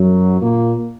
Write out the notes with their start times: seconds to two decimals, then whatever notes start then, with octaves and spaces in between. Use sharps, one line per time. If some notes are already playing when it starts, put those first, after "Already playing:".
Already playing: F#2 F#3
0.41 A#2 A#3